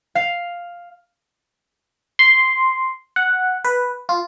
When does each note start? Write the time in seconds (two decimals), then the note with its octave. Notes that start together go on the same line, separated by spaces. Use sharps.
0.15 F5
2.19 C6
3.16 F#5
3.65 B4
4.09 F4